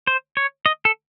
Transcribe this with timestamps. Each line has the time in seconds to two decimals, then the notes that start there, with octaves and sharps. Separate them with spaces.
0.07 C5
0.37 C#5
0.66 D#5
0.85 A4